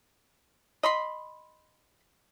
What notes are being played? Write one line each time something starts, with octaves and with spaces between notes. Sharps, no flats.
D#5 B5 C6